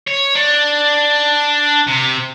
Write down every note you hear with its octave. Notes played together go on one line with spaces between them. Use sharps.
C#5
D4
C3